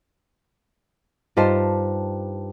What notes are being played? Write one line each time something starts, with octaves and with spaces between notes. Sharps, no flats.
G2 D#4 F4 G4 C5 A5